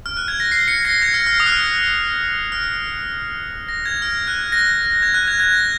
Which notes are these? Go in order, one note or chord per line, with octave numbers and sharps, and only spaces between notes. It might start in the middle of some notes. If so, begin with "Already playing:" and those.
F6
F#6
G#6
A#6
C7
C#7
A#6
G#6
F6
F6
D#6
F#6
F6
F6
A#6
G#6
F6
F#6
A#6
G#6
F#6
G#6
G#6
A#6